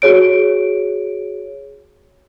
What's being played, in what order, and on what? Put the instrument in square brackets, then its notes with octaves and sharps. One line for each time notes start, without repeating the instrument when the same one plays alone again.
[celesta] F#4 G#4 C#5 D7